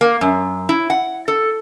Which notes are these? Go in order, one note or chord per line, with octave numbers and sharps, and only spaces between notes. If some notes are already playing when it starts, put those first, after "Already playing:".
A#3
F#2
E4
F#5
A4